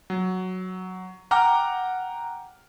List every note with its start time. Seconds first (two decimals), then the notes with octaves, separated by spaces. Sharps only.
0.10 F#3
1.31 F#5 G5 A#5 D6 F6